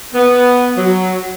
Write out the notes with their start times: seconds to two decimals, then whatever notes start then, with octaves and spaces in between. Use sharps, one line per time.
0.13 B3
0.77 F#3